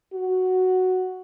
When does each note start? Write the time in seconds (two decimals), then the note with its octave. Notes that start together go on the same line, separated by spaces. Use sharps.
0.14 F#4